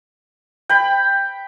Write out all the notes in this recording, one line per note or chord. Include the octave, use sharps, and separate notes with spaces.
G5 B5